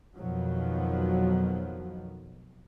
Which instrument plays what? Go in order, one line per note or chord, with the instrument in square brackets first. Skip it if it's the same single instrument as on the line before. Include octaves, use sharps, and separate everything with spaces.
[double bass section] F2 B2 D#3 F3 F#3